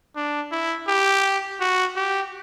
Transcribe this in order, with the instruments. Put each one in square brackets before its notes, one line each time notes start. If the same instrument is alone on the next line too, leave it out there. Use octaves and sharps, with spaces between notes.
[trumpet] D4
E4
G4
F#4
G4